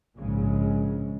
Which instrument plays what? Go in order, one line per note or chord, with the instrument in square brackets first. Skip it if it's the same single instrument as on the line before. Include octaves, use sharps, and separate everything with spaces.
[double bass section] A#1 G#2 C#3 G#3